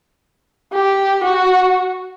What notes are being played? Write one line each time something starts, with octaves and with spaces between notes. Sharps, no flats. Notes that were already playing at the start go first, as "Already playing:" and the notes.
G4
F#4